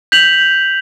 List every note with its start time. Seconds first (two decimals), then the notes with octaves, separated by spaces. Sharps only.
0.12 G6 B6 F7 F#7